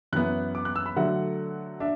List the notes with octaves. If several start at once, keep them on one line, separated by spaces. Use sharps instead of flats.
F#2 E3 B3 F#6
D6
F#6
E6
B5
D3 F#3 A3 F#5
D4 E5